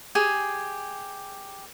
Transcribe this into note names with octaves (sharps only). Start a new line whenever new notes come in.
G4 G#4 G#5